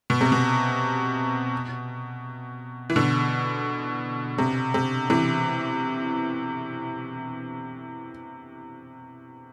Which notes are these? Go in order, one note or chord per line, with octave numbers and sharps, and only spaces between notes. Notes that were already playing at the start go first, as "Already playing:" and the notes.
B2
C3
B2
E3
B2 D3
C3
C3
C3 E3